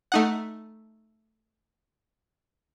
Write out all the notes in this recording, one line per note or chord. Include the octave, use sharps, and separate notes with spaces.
A3 D#4 F#5